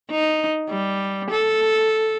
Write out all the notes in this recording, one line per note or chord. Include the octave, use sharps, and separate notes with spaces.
D#4
G3
A4